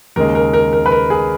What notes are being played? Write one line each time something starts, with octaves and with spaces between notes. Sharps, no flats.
D#2 C#3 G#3 A#4
A#4
A#4
A#4
B4
A#4
G#4